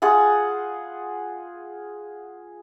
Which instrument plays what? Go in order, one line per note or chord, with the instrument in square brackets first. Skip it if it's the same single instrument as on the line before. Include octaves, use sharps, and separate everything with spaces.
[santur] F4 G#4 F#5 A5